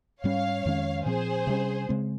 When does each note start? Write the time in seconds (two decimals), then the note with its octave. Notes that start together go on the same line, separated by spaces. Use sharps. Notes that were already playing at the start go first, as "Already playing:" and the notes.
0.24 G#2 G3 C#4 C#5 F5
0.66 F2 D#3 G#3 C#4
1.06 A#2 F3 C4 G#4 C5
1.47 C3 G3 C#4
1.89 C#3 G#3 C4